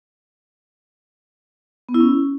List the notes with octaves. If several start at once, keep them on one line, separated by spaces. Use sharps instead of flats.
B3
E4
C#4